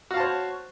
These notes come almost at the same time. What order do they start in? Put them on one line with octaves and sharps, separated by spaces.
F#4 F5 A5 C5 C#5